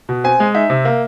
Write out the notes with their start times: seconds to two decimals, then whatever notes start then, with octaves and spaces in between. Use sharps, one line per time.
0.09 B2
0.24 C4 G#5
0.40 G#3
0.55 D#4 E5
0.70 C3
0.85 A#3